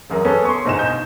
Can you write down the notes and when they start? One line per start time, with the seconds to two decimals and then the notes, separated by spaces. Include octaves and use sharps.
0.10 E1 F#2 A#4
0.25 B3 C#4 G#4 A4
0.45 C6 C#6
0.65 G1 G#2 B2 D#4 G#5 E7
0.79 G6